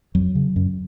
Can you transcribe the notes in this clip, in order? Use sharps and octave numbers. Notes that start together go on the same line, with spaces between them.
F2 F#3
C#3
F#2